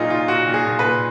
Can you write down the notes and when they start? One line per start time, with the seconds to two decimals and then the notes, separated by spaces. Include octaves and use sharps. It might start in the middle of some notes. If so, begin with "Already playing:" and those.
Already playing: A#2 F#3 A#3 D#4 F4 G#4
0.10 A#2 F4
0.28 A#2 F#4
0.48 A#2
0.54 G#4
0.67 A#2
0.79 B4
0.85 A#2